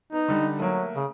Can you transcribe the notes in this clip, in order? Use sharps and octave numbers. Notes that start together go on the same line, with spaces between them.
B3 D#4
D3 G3
F#3 A3 A#3
C#3